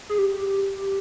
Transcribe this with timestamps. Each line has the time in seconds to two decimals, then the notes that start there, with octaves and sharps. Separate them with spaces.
0.09 G#4
0.18 G4